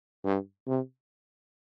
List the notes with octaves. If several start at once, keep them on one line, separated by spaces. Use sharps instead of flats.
G2
C3